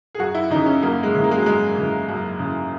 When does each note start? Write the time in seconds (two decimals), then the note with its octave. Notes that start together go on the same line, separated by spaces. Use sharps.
0.15 G#4
0.19 F#2 F#4
0.35 E4
0.50 C#3 E3 D#4
0.66 C#4
0.82 F#2 A#3
1.03 G#3
1.14 C#3 E3
1.24 A#3
1.31 G#3
1.38 F#3
1.45 F#2 G#3
1.77 C#3 E3
2.08 F#2
2.39 C#3 E3